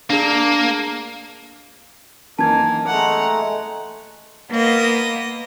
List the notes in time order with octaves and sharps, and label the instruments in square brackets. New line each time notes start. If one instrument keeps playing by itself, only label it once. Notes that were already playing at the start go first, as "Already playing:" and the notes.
[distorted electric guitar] A#3 [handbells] D4 G#4
[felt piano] F#2 E3 [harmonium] D#3 [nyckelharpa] A#3 [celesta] A5 G#6
[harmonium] G#3 A3 [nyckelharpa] F#5 A#5
[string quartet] A#3 B3 D#5